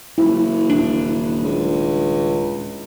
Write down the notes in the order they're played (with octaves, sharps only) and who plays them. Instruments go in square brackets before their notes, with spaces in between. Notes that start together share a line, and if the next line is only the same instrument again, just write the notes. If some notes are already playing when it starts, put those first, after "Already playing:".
[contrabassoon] F#1 [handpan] E4
[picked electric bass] D#1 G#1 D4
[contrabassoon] C#2